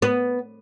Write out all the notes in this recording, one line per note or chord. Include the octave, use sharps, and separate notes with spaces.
B3